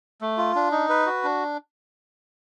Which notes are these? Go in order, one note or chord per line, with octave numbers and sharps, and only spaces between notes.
A3
F4
D4
D#4
B4
F#4
D4